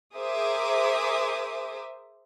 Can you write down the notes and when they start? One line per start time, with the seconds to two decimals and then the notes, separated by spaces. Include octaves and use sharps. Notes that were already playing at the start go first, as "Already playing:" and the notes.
0.15 G#4 A#4 C5 E5 D6 D#6